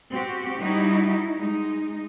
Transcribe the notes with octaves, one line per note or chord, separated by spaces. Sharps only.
C4 F#4 G4
G3 D#4 E4 F#4
G#3 D#4